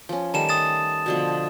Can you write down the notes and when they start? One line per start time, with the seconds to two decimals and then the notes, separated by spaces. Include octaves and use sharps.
0.09 F3 C#4
0.34 D#3 G3 A3 A5 E7
0.49 D#6 A6 E7
1.06 B2 D3 F3